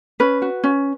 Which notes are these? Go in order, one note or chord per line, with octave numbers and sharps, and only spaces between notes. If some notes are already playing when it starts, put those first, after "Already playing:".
C#4 B4
F#4
C#4